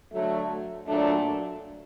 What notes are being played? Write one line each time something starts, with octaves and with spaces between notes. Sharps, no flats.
D3 F#3 A3
A#2 F#3 A3 D4